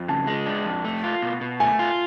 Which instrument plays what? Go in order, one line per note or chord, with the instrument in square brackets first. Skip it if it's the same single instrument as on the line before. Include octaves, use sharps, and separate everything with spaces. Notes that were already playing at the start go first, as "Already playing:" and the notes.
Already playing: [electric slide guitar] F2
[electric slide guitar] C#3 [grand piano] A5
[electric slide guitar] G#3
D4
F2
A3
F4
B2
B2
[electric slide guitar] A3 [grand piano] G#5
[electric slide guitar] F4